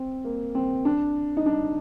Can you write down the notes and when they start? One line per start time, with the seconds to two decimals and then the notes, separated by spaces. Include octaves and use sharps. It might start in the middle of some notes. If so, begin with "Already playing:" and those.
Already playing: C4
0.25 A#3
0.55 C4
0.85 D4
1.37 D#4
1.46 D4